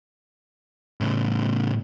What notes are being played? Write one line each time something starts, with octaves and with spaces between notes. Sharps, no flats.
A2 C#3